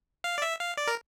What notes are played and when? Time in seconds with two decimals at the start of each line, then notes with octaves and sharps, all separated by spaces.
0.24 F5
0.38 D5
0.42 E5
0.60 F5
0.77 D5
0.87 A#4